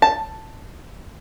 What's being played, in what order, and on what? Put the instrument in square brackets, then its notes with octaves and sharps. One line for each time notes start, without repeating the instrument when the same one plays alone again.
[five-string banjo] A5